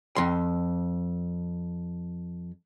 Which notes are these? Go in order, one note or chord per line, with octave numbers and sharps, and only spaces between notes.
F2 C6